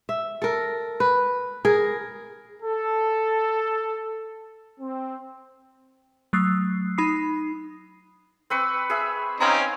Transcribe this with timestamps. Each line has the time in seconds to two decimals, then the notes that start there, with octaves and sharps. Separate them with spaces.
0.09 E5
0.42 A4 A#4
1.00 B4
1.65 G#4 A#4
2.63 A4
4.80 C4
6.33 F#3 A3 D#6 E6 F#6 C7
6.98 D#4 B5 D#6 C7
8.50 C4 B4 C#6
8.90 G#4 E5
9.40 C4 C#4 D#4 F5 G#5 A#5